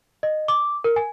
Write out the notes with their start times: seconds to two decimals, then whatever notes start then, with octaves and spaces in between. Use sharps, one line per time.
0.23 D#5
0.48 D6
0.84 A#4
0.96 G#5